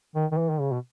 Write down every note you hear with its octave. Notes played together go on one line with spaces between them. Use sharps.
D#3
D#3
E3
D#3
C#3
B2